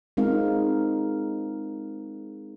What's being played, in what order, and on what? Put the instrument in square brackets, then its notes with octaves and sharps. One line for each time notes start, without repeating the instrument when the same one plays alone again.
[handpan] G#3 C4 D#4 F4 A#4 F5